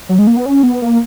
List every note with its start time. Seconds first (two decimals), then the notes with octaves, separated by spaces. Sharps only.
0.09 F#3
0.19 G#3
0.27 A#3
0.37 B3
0.46 C#4
0.63 B3
0.82 A#3